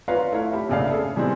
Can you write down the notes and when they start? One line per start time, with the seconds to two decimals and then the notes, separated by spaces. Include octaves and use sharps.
0.08 F4 B4 C#5 D5 F5 A#5
0.32 A3 E4 C#5 F5
0.53 A3 G4 G5 B5
0.70 F1 A#1 C#3 D5 E5 F5
0.90 G#4 A4
1.16 C3 E3 G3 G#3 B3 C4